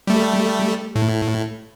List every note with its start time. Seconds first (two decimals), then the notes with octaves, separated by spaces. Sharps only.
0.07 G3 A3
0.96 A2